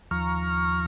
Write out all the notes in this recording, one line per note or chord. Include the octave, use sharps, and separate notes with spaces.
D#2 F3 A#5 C#6 F6